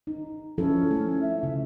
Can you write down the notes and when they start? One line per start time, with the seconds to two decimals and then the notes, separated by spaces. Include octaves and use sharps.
0.07 D#4
0.58 F3 C#4 E4 A4
0.91 A3
1.22 E5
1.43 C#3